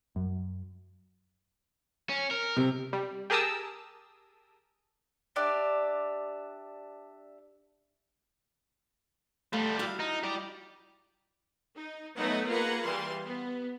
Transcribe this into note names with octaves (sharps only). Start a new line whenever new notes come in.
F#2
C#4
A#4
C3
G3
G4 G#4 A#4 A5 D#6 E6
D4 G4 D5 E5
G3 A3 F4
E4 F#4 F5
D#4
G4 D5
D#4
F#3 A3 B3 D#4 B4 F#5
A#3 F4 G#4 B4 F#5 A#5
E3 G3 F5 C6
B3